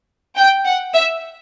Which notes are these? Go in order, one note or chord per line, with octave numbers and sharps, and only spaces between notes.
G5
F#5
E5